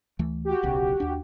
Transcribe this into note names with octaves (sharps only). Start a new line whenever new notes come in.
D2 E3 A3
F#4 G4
D1 B1 C#3
D#2 D4